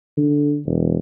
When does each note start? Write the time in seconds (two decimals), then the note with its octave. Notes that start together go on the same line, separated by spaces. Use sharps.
0.17 D3
0.66 E1